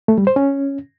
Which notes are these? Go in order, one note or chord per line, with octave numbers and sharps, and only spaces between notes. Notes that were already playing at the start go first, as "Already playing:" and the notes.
A3
G3
C5
C#4